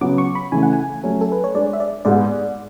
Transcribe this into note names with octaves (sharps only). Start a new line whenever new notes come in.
C#3 F#3 B3 D6
C#6
B5
C#3 E3 A3 G#5
F#5
G#5
F#3 A3 C#4 F#4
A4
B4
C#5
G#3 D4 G#4 D5
E5
D5
G#2 G#3 B3 D5